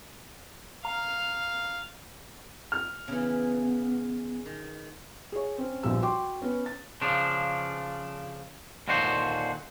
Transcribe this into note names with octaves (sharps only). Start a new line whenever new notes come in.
F5 A#5
F6
C#3 E3 B3
D#3
G#4 C#5
C4 C#4
A#1 B2 F3 G3 E6
F#4 G5 C6 D6
B3 C#4
A6
C#3 F3 D4
D#2 A#2 D3 F#4 C5